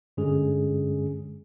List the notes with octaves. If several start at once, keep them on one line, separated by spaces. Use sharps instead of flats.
G2 D3 G#3 C#4 G#4